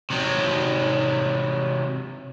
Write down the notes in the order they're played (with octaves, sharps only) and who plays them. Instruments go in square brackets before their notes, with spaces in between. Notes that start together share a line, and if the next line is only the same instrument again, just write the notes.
[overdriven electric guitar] C3 F#3